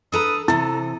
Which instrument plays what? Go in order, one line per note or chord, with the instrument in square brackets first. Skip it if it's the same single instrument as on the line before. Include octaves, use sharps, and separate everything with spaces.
[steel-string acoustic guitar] D4 A4 A#5 [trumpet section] B4 D#6
[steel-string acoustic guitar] C3 E3 [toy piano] E4 [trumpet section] A4 A#5